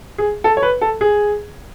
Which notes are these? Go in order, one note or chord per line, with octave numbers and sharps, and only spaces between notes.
G#4
A4
C#5
B4
A4
G#4